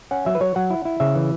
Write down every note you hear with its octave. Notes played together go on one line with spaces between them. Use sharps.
C#4 F#5
F#3 E5
B4
F#3 C#5
F#3 F#5
E4
E4
C#3 E5
E3